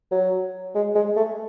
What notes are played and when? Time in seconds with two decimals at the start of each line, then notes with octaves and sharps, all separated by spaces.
0.11 F#3
0.75 G#3
0.95 G#3
1.16 A3